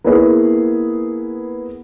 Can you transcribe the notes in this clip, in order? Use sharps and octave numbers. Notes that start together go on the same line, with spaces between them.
A#3 B3 E4 G#4 B4